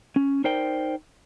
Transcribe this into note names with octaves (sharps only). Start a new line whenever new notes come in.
C#4
D#4 A#4 C5 D5 G5